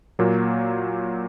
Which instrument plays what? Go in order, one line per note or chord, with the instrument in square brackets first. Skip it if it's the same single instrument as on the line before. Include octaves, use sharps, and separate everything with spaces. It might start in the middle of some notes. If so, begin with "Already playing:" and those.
[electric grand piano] A#2 F#3 A#3